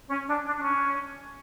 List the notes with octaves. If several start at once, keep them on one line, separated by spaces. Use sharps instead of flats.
C#4
D4
D4
D4
C#4